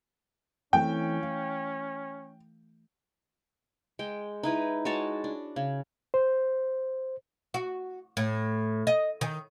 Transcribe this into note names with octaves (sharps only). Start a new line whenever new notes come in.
E3 A3 C4 C#4 G5
F5
G#3 G5
D#4 E4 B4 D#5
G#3 F#4 C#5 A5
D4
C#3
C5
F#4
A2
D#5
D#3